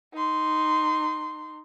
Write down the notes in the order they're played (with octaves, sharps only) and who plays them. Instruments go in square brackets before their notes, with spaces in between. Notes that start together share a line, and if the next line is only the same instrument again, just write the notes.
[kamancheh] D#4 C6